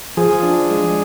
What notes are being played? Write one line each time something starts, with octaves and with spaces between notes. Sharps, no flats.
F3 G#4
D4
G#3